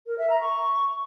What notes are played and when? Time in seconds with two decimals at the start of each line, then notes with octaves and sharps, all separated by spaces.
0.06 A#4
0.18 E5
0.29 A#5
0.40 C#6